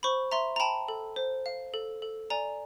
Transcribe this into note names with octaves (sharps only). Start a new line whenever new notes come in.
C5 B5 C#6
E5 A#5 C6
A#5
G5 A5 B5
A4
C5
F5
A4
A4
D5 G#5 A#5